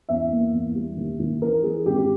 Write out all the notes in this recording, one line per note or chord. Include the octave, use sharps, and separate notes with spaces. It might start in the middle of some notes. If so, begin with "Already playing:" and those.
E2 E5
A#3
E2
G3
D#2
D#2
E3 A#4
E3 G#4
G#1 G4
G4